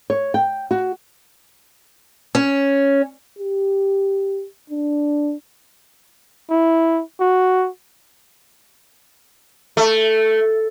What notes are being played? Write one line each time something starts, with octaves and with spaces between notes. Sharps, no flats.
C#5
G5
F#4
C#4
G4
D4
E4
F#4
A3